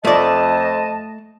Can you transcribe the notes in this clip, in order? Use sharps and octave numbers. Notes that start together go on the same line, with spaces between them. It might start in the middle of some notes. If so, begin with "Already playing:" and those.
F2 A3 D5 D#5 A5